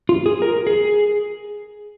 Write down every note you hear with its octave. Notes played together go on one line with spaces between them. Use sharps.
F4
G#4
A#4
G#4